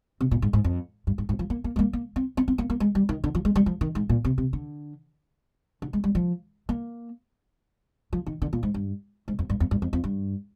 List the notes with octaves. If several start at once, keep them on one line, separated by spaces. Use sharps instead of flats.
C3
A#2
G#2
G#2
F2
G2
G#2
G#2
F3
A#3
A#3
G#3
A#3
A#3
C4
C4
C4
A#3
A#3
G#3
G3
D#3
D3
F3
G#3
G3
F3
D#3
G#2
A#2
C3
C3
D3
D3
G#3
G3
F3
A#3
F3
D#3
D3
A#2
G#2
G2
G#2
F2
G2
F2
G2
F2
F2
G2